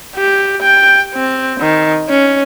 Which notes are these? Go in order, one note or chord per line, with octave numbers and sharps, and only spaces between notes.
G4
G5
C4
D#3
C#4